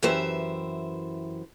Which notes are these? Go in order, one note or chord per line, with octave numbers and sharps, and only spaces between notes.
F#2 E3 G4 C5 E5